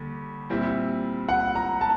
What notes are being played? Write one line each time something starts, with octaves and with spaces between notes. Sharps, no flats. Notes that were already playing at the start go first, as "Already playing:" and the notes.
Already playing: D#2 D3 G3
A#2 G3 C4 E4
F#5
A#5
A5